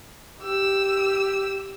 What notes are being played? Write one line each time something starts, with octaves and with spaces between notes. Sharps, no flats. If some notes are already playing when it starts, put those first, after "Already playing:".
G4 E6